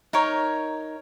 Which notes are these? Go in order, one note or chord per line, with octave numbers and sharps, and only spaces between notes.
D#4 A#4 C#5